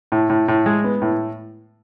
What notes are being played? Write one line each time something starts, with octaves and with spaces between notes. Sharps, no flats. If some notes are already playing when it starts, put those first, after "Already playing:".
A2
A2
A2
G#3
B3
A2